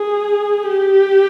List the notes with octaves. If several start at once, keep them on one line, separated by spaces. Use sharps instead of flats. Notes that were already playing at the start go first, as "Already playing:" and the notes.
Already playing: G#4
G4